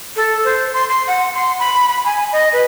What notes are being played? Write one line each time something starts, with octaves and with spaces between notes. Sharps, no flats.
A4
C5
C6
C6
F#5
C6
B5
B5
G#5
D#5
B4